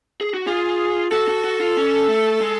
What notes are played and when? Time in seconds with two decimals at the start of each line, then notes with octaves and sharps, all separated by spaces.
0.21 G#4
0.34 F#4
0.47 F4 G#4
1.11 F#4 A4
1.28 F#4
1.44 F#4
1.60 F4
1.77 C#4
2.08 A3
2.41 G#3